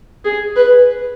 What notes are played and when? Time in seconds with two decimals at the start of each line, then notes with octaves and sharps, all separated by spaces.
0.24 G#4
0.56 B4